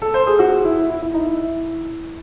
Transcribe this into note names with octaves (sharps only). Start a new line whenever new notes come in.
A4
C5
G#4
F#4
E4
E4
E4
D#4
E4